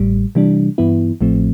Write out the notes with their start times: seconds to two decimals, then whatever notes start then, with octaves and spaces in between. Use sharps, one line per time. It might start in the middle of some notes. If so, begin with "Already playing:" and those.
Already playing: A1 A2 G3
0.35 C3 E3 G3 D4
0.78 G2 E3 B3 E4
1.21 A1 A2 F3 A3 C4